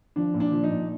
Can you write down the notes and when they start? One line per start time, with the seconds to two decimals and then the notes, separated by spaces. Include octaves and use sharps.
0.16 F3 D4
0.34 A#2
0.40 D4
0.52 F3
0.64 D#4
0.71 A#2